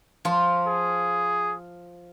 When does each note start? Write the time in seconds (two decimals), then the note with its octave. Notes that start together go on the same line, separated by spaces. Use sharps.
0.25 F3 F4
0.67 G#4